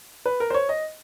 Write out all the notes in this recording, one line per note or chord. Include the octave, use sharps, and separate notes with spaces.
B4
A#4
C5
C#5
D#5